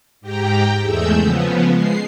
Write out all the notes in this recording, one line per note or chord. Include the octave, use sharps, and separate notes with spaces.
G#2 G4 G5 A#5
E2 G#3 A3 G#4 E6 G6
C#3 F3 B3
G#3 C7